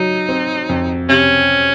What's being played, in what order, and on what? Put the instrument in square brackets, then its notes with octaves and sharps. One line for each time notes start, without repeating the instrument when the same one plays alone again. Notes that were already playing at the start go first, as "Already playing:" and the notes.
Already playing: [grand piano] F#3 [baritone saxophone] D#4
[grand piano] C4
F2
[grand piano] C3 [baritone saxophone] C#4